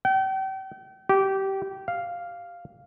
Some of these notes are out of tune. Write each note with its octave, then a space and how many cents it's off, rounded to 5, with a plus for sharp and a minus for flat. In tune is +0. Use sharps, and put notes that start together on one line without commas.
G5 -35
G4 -20
F5 +0